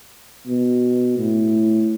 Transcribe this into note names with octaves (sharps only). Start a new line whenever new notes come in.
B2
A2